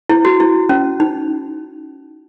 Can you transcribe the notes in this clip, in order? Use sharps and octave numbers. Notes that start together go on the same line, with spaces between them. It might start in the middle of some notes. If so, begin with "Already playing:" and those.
E4
F#4
E4
C#4
D#4